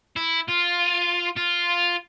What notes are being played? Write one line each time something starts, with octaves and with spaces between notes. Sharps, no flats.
E4
F4
F4